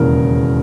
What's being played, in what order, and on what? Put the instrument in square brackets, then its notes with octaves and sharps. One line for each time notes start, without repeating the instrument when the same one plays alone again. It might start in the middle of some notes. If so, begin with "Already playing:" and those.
Already playing: [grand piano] E1 D#2 C#3 E3 A#4